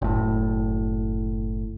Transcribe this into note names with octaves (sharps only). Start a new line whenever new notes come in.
F#1 A2